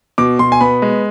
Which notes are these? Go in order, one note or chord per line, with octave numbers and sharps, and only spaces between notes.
B2 D6
B2 C6
G#5
B3 B5
G#3